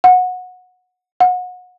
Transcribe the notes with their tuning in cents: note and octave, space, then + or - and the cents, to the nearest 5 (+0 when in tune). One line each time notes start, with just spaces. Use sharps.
F#5 -20
F#5 -30